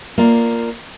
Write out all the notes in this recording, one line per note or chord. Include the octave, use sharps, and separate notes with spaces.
A#3 F4 D5